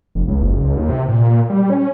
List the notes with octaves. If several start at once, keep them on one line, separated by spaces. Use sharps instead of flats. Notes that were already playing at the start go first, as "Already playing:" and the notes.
F1
C#2
F#1
C#2
D#2
C3
A#2
G3
C#4